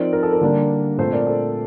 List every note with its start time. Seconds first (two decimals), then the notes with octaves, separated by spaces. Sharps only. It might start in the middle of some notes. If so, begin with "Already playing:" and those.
Already playing: F3 C4 D#4 A#4 D5
0.13 A#4
0.23 A4
0.32 A#4
0.41 D3 G3 A#3 D4
0.98 A#2 A3 C4 A4 C5
1.13 A#4 D5
1.26 A4 C5